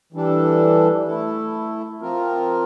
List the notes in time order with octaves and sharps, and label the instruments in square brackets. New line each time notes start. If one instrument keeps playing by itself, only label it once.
[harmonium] E3 G3 D4 A4
A3 E4 A4
F3 C4 F4 A#4